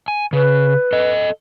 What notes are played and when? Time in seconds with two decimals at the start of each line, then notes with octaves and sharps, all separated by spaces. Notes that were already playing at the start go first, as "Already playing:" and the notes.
0.08 G#5
0.33 C#3 B4
0.93 A4 D#5